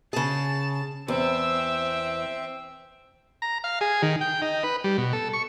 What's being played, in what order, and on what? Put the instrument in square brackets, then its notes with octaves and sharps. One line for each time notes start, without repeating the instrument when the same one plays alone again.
[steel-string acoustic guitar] C#3 G#4 [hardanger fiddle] A5
[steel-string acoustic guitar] E2 [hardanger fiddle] C4 E5 [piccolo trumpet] E6
[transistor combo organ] A#5
F5
G#4
D#3
G5
D#4
B4
G3
B2
A4
C#6